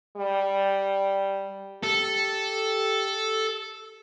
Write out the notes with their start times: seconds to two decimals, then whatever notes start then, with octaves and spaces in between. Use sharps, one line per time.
0.16 G3
1.83 G4 A4